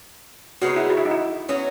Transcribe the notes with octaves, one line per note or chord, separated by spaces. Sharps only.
C#3 G#3 B3 D#4 F#4
E4
F#4
E4
D#4
E4
F#3 B3 C#4 F#4